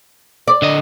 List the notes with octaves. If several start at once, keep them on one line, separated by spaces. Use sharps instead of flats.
D5
D3 D#5